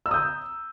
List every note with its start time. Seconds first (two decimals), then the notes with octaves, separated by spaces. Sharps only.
0.06 E6
0.08 A#5
0.11 D#6
0.14 G6